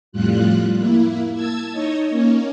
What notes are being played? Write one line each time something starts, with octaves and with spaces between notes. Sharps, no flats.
F2 A2 G3 F4 F#6
A#3 E4
A5 E6 G#6
D#4 C#5 D#5
A#3 C#4